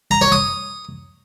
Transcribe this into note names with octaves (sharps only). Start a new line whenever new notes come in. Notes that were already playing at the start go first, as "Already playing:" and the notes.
A#5
C#5
D#6